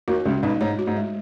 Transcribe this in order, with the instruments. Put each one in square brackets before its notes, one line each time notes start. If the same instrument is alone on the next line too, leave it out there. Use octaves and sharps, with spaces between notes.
[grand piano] D#2 D#3 [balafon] F#4
[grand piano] C#2 C#3 [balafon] G#3
[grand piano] B1 B2 [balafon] D#4
[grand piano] G#2 [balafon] C#5
[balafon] F#4
[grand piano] G#2
[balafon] G#3